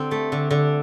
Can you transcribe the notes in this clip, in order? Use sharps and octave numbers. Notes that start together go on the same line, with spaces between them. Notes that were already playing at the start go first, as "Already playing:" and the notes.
Already playing: D3 C4
A3
D3
D3